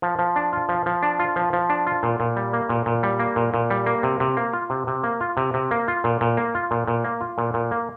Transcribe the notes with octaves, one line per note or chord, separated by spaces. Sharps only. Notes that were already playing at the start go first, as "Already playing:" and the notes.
F3
F3
D4
F4
F3
F3
D4
F4
F3
F3
D4
F4
A#2
A#2
G3
A#3
A#2
A#2
G3
A#3
A#2
A#2
G3
A#3
C3
C3
A#3
F4
C3
C3
A#3
F4
C3
C3
A#3
F4
A#2
A#2
A#3
F4
A#2
A#2
A#3
F4
A#2
A#2
A#3